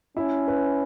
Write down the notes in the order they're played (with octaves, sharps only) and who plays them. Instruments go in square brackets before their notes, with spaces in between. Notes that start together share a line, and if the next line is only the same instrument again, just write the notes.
[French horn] C#4 [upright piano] E4
[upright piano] B4